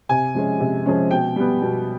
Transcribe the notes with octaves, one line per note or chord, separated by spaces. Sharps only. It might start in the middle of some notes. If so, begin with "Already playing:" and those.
C3 G#5
F3 G#3 C#4
C3
F3 G#3 C#4
B2 G5
G3 B3
B2